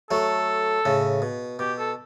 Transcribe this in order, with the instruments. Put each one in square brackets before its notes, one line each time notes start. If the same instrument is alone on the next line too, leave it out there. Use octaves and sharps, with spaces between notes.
[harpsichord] F#3 A3 [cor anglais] A4
[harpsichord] A2 C#3
B2
[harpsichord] B2 [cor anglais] G4
[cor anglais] A4